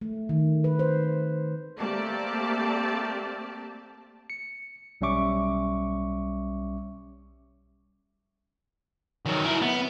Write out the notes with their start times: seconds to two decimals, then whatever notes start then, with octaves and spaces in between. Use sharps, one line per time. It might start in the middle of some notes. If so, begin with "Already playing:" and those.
0.02 A3
0.29 D#3
0.64 B4
0.79 C5
1.78 A3 A#3 C4 G4 D5 A5
4.30 C#7
5.01 B1 G3 C#4 E5 C#6 D6
9.26 D#3 F#3
9.44 E4 A#4
9.62 B3